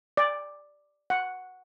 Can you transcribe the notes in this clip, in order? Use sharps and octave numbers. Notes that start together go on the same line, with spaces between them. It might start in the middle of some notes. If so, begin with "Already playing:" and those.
D5
F#5